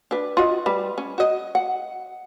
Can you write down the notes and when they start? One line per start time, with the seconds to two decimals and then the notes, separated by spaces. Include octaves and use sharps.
0.11 D4 B4
0.37 F4 F#4 D#5
0.66 G3 B4
0.98 C#4
1.18 F#4 D#5
1.55 F#5